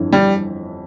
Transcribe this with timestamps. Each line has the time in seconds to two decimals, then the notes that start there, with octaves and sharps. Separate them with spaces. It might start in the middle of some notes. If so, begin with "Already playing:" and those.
Already playing: G1 F2 E3
0.13 G1 G3